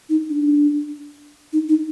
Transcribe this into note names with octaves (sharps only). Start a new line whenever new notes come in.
D#4
D4
D#4
D#4